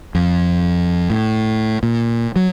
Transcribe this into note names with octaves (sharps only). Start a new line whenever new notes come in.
F2
A2
A#2
F#3